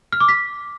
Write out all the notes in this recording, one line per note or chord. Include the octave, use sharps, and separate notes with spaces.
F6
D6
B6